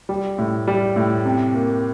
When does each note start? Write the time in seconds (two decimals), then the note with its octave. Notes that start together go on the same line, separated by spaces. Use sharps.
0.09 G3
0.38 A2
0.67 G3
0.96 A2
1.25 C3
1.54 A#3